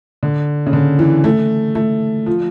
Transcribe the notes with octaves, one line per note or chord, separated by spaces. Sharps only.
D3
C#3
D3
E3
A3
A3
F3